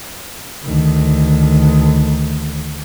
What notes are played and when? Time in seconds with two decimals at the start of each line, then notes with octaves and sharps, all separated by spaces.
0.64 D2 D#3